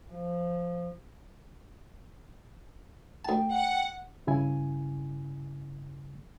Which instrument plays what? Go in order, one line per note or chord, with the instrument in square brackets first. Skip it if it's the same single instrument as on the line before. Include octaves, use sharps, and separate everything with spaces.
[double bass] F3
[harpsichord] D2 A5 [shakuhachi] G5
[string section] F#5
[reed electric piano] G2 C#3 E4 G#5